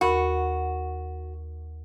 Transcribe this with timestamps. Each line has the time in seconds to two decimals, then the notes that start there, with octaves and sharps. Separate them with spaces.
0.01 D#2 F#4 A#4 B5